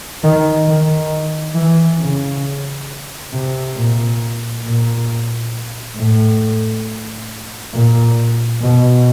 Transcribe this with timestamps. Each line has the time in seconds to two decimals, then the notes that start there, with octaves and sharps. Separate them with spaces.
0.23 D#3
0.67 D#3
1.55 E3
1.99 C#3
3.32 C3
3.77 A#2
4.64 A#2
5.97 A2
7.73 A#2
8.62 B2